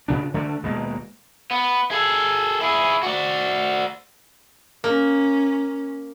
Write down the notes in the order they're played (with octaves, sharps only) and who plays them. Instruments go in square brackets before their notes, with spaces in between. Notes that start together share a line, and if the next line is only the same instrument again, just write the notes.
[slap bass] A#2 C#3 D4
D3 A3 D4
D#1 B2 G#3 A#3
[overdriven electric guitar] B3
G#4 A4
E4 G#4
F#4 D5
[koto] A#3 [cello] C#4